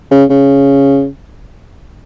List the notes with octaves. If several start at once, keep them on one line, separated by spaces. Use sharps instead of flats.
C#3
C#3